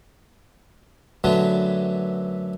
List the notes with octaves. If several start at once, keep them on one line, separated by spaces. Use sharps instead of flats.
F#2 D3 F#3 A3 B3